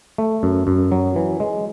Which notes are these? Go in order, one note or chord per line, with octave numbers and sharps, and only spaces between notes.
A3
F#2
F#2
F#3
E3
G#3